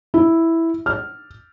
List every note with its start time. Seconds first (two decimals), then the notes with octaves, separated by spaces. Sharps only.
0.14 E4
0.86 F6